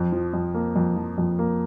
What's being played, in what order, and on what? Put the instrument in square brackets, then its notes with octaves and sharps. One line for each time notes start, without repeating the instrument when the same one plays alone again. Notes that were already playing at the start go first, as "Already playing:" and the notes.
Already playing: [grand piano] F2
F3
F2
A#3
F2
F3
F2
A#3